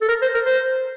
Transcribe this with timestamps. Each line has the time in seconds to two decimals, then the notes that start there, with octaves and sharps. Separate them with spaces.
0.01 A4
0.08 A#4
0.22 C5
0.34 A#4
0.46 C5